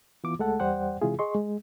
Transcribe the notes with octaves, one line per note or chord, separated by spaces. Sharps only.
E3 B3 F4 D6
C#2 G#3 A3 A4 F#5 A5
E2 G3 C5 D5 F#5 G5
C3 E3 G#3 E4 F4 G#4
G#4 D#5 C6 C#6
G#3